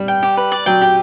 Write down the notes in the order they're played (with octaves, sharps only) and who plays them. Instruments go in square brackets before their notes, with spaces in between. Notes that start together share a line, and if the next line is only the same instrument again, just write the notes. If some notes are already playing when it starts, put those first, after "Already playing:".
Already playing: [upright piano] G3
[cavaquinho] G5
G4
B4
D5
[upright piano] F#3 [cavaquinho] G5
[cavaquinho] G4